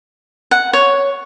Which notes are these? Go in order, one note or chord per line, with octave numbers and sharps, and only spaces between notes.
F#5
C#5